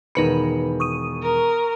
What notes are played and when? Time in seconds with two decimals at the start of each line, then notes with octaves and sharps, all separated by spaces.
0.15 E1 D#3 D#4 B4 B5 C#7
0.80 C#6 D#6 D#7
1.22 A#4